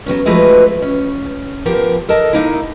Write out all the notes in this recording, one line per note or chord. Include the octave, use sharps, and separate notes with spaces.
F#3 G#3 B3 C#4
E3 F3 G#3 A3 F#4 B4
C#4
F3 B3 G4 A#4 F5
A4 A#4 D#5 A5
A#3 D#4 E4